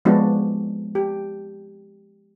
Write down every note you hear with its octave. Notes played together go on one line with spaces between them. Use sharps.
F3 G#3 B3 D4 F#4
G4